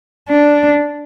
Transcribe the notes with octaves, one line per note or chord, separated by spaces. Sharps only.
D4